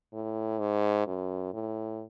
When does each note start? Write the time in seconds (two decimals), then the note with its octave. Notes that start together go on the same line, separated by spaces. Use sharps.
0.14 A2
0.59 G#2
1.07 F#2
1.54 A2